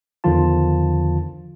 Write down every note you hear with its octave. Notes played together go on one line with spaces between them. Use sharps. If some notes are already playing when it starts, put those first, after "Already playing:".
E2 D3 D#3 F3 F4 A5